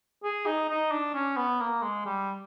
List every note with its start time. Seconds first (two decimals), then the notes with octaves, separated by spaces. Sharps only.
0.24 G#4
0.46 D#4
0.70 D#4
0.91 D4
1.14 C#4
1.37 B3
1.60 A#3
1.82 G#3
2.05 G3